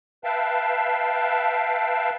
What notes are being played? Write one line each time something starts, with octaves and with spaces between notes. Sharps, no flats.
B4 E5 F5 G5 A5